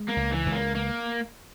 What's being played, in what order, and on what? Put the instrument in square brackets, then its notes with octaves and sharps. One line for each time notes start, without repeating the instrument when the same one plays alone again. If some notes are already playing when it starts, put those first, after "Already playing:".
Already playing: [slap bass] G#3
[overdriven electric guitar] A#3
[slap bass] C#2
[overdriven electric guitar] E3
[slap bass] C#2
[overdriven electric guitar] A#3
A#3